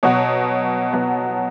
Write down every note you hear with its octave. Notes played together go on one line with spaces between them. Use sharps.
B2 F#3 B3 C#5
B2 F#3 B3